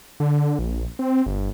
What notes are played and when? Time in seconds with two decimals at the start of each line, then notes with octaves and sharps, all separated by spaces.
0.20 D3
0.59 A#1
0.99 C4
1.26 G1